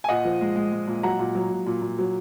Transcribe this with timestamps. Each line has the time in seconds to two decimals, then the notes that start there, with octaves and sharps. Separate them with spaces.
0.04 G#5
0.09 A#2 D#5 F#5
0.25 F3
0.41 G#3
0.56 G#3
0.72 G#3
0.87 A#2
1.03 F#3 F#5 A#5
1.19 A#2
1.35 F#3
1.51 A#2
1.66 A#2
1.82 A#2
1.99 F#3